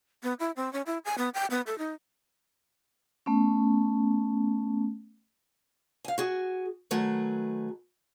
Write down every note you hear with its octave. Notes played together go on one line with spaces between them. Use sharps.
B3
E4
C4
C#4
E4
G#5
B3
G5
B3
A4
D#4
A3 B3 C#4
F5 G#5
F#4 G#4
D#3 F#3 A3 G#4 B4